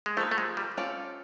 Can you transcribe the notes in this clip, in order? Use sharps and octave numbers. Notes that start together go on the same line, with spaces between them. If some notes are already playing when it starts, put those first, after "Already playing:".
G#3
F3 A3 A#3 D#4
A3
G#3
G3
C#4 F4 A4 D5